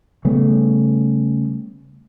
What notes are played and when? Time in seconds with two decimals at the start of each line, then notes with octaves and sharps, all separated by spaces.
0.25 C#3 G3 A3 B3